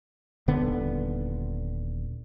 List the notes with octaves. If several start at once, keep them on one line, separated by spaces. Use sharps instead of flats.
D#1 D3 B3